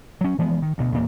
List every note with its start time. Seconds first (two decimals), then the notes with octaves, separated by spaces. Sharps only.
0.21 F#3 C#4
0.38 E3 F3 G#3 B3
0.62 D#3
0.78 D2 B2
0.92 E2 A#2 A#3